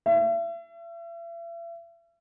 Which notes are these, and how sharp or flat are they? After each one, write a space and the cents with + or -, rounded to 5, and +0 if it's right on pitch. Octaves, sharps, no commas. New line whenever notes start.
E5 +40